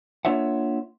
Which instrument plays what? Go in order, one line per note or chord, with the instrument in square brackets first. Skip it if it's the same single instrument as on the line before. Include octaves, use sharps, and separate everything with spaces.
[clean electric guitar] A#3 D4 F4 C#5 E5 F#5